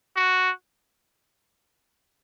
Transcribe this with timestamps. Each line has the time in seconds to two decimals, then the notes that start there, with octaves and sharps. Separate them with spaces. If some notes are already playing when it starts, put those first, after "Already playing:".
0.16 F#4